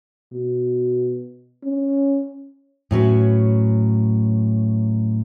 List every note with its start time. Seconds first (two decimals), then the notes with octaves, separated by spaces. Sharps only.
0.33 B2
1.63 C#4
2.91 A2 F#3 C#4 B4